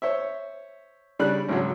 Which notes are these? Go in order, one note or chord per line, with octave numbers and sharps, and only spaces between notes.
C5 C#5 E5
C#3 G3 D4 D5 B5 F#6
G#1 C#3 F#3